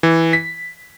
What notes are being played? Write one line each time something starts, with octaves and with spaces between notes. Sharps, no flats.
E3
B6